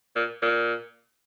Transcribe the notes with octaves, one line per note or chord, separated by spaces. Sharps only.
A#2
A#2